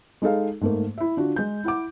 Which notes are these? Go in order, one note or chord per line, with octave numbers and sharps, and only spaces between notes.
G#3 D#4 G#4 A4 F5
G#2 A3 A#3
E4 E5
D3 D4 F4 F#4
G#3 G6
E4 F#5 D6